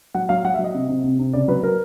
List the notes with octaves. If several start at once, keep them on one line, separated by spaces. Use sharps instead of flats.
F#3 F#5
F#3 F5
F#3 F#5
E5
F#3
D#5
C3
C3
C3
C3
C#3 D5
F#3 B4
F#3 A#4